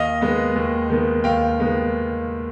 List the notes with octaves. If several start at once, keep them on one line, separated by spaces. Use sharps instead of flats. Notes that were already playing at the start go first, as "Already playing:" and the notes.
Already playing: D#2 D#5 F5
D#3 G#3 B3
D#2
D#3 G#3 B3
D#2 F5 G5
D#3 G#3 B3